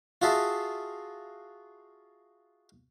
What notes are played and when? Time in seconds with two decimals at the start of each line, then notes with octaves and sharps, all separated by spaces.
0.22 F4 F#4 G#4 E5 A5